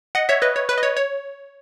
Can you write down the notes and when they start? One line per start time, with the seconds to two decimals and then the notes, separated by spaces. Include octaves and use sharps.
0.15 D#5 F#5
0.29 C#5 E5
0.42 B4 D#5
0.56 C#5
0.69 B4
0.78 D#5
0.83 C#5
0.97 C#5